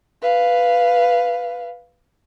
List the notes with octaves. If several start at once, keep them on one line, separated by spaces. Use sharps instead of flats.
B4 F5